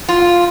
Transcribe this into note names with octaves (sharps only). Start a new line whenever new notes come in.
F4